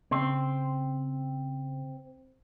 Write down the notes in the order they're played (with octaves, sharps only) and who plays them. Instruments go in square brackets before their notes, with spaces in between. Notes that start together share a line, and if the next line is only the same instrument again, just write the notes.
[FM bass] C#3 [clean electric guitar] C4 C5